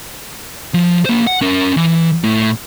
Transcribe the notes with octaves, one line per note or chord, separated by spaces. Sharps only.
F3
A#3 C5
F#5
C#4 A#4
E3
A2